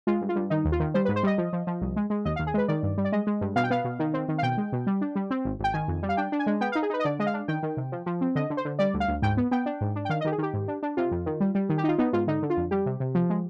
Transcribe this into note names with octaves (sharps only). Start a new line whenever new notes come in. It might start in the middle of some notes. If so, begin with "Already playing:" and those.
G#3 F4
G2
F4
G2
D#3 D#4
D#2
F4
D#3
G3 C5
B4
G#2
C5
G3 D#5
F3
F3
F3
C2
G#3
G#3
D#2 D#5
F5
D#2
G#4
G#3 B4
D#3 D5
G2
G3
D5
G#3 D#5
G#3
G2
B2 F5
G5
B3 F5
B2
D#3
C4
D#3
F5
B2 G5
G#3
B2
G3
D4
G3
C4
G#1
G#1 G5
D#3 G#5
F2
G3
F5
D4 G5
D4
G#5
G#3
B3 G5
F5
D#4
G#4
D#4 B4
D#5
D3 D5
G#3 D#5
F5
D4
D#3 G5
D#3
C3
F3
F3
C4
D3 D#5
D3
C5
D3
G3 D5
D2
F5
D2
G#2 G5
B3
B3 G5
D4
G#2
D4
G5
D#3 F5
D#5
D#3 G4
G#4
D#3 G4
G#2
D4
D4
C3 F4
F2
D#3
G3
G3
D#3
G4
D#4 F4
B3 D#4
G#2 F4
D3 D#4
D3
F4
F2
G3 G4
C3
C3
F3
G#3